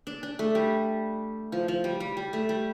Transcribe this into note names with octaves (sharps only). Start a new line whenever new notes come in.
D4
D4
A3
G3
F3
F3
G3
G3
G3
A3
G3